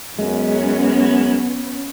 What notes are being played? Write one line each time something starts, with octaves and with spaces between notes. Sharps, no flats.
F#2 G#3 B3 C#4